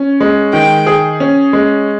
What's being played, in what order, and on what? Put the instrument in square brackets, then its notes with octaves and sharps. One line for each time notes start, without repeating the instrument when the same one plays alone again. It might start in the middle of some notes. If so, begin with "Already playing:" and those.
Already playing: [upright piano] C#4
G#3
[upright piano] D#3 [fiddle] G5
[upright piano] G#4
C#4
G#3